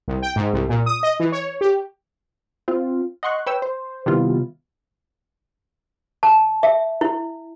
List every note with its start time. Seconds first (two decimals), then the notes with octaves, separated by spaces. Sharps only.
0.08 C2
0.22 G5
0.36 G#2
0.53 C2
0.69 A#2
0.86 D#6
1.03 D#5
1.20 E3
1.32 C#5
1.61 G4
2.68 C4 F4
3.23 D#5 F#5 C6 C#6 F#6
3.46 B4 C#5 G5 E6
3.62 C5
4.06 C3 D#3 G3 B3 E4 F4
6.23 A5
6.63 E5
7.01 E4